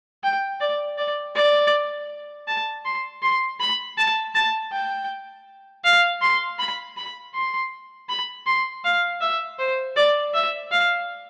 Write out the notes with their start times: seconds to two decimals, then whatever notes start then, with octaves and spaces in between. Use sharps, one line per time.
0.24 G5
0.60 D5
0.98 D5
1.35 D5
2.48 A5
2.85 C6
3.22 C6
3.60 B5
3.98 A5
4.35 A5
4.72 G5
5.84 F5
6.21 C6
6.59 B5
6.97 B5
7.34 C6
8.09 B5
8.46 C6
8.84 F5
9.21 E5
9.59 C5
9.96 D5
10.34 E5
10.71 F5